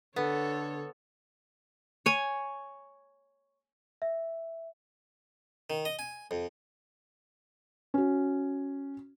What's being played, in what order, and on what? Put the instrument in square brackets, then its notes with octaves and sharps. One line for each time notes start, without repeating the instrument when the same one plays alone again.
[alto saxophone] D3 [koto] B3 [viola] A4 C#5
[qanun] C#5 G#5
[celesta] E5
[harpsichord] D#3
D#5
G#5
F2
[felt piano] C#4 F#4